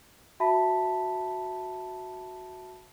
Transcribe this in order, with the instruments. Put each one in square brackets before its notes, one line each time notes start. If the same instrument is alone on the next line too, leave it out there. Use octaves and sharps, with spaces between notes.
[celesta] F#4 E5 A5 B5 B6